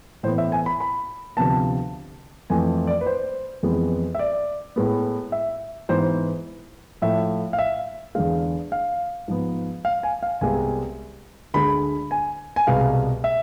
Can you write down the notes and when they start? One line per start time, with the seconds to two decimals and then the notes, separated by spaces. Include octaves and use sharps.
0.23 A2 E3 B3 C5
0.38 E5
0.52 G#5
0.66 B5
0.80 B5
1.37 D2 C3 F3 B3 A5
2.50 F2 E3 A3 G#5
2.87 D5
3.01 B4
3.06 C5
3.63 F2 E3 G#3 B3
4.15 E5
4.19 D5
4.76 A2 G#3 B3
5.32 E5
5.89 G#2 E3 B3 C5
7.02 A2 F3 A3 E5
7.53 F5
7.59 E5
8.15 E2 D3 G#3 F5
8.72 F5
9.28 G#2 F3 B3
9.85 F5
10.03 G#5
10.23 F5
10.41 C2 C3 G#3 B3 G#5
11.54 D2 D3 G#3 B5
12.11 G#5
12.56 G#5
12.67 C2 B2 G#3 B3 F5
13.24 E5